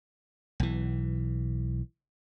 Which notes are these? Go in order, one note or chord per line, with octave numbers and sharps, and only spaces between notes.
B1 E3